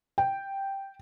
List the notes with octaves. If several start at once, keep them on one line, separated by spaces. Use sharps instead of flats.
G5